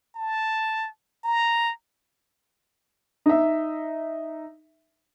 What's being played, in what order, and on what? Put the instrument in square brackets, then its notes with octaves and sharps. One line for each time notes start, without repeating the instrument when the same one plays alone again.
[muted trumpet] A5
A#5
[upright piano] D#4 E5